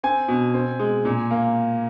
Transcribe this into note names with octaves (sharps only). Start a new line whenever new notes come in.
C4 G#5
B2
C4
G#3
A#2
A#3